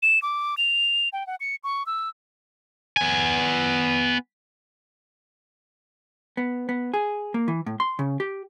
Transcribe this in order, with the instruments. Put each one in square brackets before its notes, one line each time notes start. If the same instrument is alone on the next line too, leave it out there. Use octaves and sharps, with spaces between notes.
[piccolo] E7
D6
F7
G5
F#5
C#7
C#6
E6
[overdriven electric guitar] B3 G#5
[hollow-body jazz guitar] B3
B3
G#4
A#3
E3
A2
C6
C#3
G4